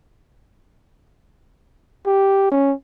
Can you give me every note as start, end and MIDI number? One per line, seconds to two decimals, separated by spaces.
2.06 2.50 67
2.52 2.74 61